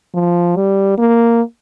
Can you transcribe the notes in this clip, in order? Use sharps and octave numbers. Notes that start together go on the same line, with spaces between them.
F3
G3
A#3